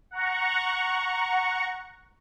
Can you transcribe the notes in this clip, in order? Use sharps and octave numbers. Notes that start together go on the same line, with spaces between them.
F#5 A#5 C#6